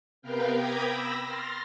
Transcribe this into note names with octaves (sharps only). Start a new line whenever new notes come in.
C3 B3 A#4 B4 F5 G5
G5 A#5 B5 D6 D#6 G#6
B5 E6 A#6
C6 F6 A6 A#6